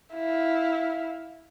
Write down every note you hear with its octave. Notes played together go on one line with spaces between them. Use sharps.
E4 F5